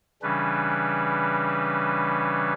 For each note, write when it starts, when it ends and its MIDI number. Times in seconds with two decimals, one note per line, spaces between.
0.22 2.53 49
0.22 2.53 52
0.22 2.53 55
0.22 2.53 61
0.22 2.53 62
0.22 2.53 71